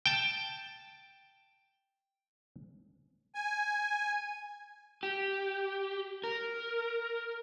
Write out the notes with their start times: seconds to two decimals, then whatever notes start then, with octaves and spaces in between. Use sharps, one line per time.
0.06 G5 A5
3.35 G#5
5.03 G4
6.24 A#4